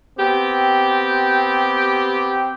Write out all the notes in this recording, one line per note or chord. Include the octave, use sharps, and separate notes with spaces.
B3 C4 G4